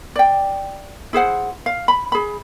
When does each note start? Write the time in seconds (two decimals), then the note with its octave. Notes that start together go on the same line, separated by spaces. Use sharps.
0.16 D5 G5
1.13 E4 G#4 C5 F#5
1.66 F5
1.88 B5
2.12 G#4 B5